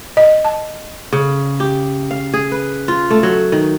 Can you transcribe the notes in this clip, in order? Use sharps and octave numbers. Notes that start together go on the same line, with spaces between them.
D#5
A5
C#3
G4
F5
G#4
B4
F4
A3
F#3
D#3